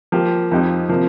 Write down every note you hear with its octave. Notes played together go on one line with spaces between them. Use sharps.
F3 A#3 G4
F2 F3 D#4 G4
C3 F3 A#3